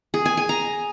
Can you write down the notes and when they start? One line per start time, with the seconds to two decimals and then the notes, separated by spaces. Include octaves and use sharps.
0.14 G#4
0.26 G#5
0.37 G#5
0.49 A#5